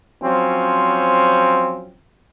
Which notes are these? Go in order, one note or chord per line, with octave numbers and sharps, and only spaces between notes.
F3 F#3 C4 C#4